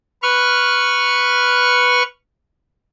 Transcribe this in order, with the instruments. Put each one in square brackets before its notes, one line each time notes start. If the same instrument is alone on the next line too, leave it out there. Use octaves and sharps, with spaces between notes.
[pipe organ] B4 C#6 F6